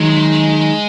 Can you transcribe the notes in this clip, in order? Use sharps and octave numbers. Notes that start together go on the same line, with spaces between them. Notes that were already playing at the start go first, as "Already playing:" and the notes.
Already playing: D#3 F#3 G#3